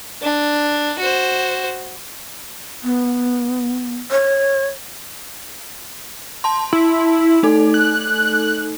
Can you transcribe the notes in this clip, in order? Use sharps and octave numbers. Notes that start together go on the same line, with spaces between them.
D4
F#4 C5
B3
C#5
A5 C6
E4
A3 D#4 A4
F#6